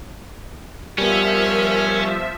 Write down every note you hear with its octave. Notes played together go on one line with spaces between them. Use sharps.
F3 G3 B3 C#4 A#4 E5